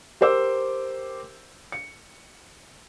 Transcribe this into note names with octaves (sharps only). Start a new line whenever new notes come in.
G4 A#4 C5 D6 E6
C#7